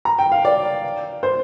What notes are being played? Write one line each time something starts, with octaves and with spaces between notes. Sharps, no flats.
A#5
G5
F5
D5
C5